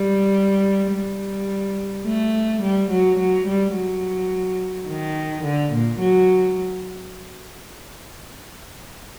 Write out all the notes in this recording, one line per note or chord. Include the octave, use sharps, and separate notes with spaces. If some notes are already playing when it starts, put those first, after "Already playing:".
Already playing: G3
G3
A3
G3
F#3
F#3
G3
F#3
D#3
D3
A#2
F#3